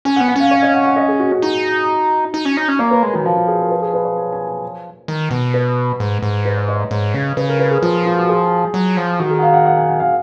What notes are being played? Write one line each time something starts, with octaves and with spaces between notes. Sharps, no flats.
C#4 G#5
F#5
B3
F#5
C#4 F5
C#5
D#5
F#5
F#5
D#5
G#4
F#4
F#4
D#4 F#4
D#4
C#4
D#4
C#4
A#3 C#5
B4
G#3 A#4
D#3 F#4
F3 F4
F4
G#4
A#4
B4
G#4
B4
C#5
G#5
G#5
G#5
D#3
B2
B4
G#2
G#2
B4
C#5
D#5
C#5
G#2
C#3
C#3 B4
A#4
B4
G#4
F3 F4
F4
F#4
G#4
F#3
F3
D#3 F#4
G#4
F#5
F5
F#5
F#5
G#5
F#5
F5